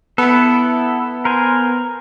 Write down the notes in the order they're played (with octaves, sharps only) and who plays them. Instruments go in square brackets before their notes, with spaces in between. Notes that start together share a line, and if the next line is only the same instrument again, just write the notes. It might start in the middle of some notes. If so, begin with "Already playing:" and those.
[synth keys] B3 [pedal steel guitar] E4 A4
[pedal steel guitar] A#4 C5 G#5